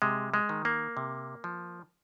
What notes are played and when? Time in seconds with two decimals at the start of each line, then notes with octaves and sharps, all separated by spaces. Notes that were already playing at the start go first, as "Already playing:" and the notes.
0.02 C3 G#3
0.34 G#3
0.49 D#3
0.65 A#3
0.97 C3
1.44 F3